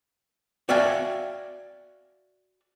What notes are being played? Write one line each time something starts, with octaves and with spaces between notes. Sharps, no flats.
F#4 D5 E5 F5 G5 G#5